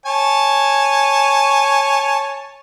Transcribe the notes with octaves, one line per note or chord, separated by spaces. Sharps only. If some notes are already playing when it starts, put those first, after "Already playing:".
C#5 G#5 A5